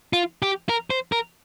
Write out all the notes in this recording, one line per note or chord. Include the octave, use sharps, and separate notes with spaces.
F4
G4
A#4
C5
A#4